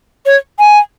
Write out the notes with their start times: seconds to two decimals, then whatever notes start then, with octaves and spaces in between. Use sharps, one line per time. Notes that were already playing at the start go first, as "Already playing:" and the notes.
0.26 C#5
0.59 G#5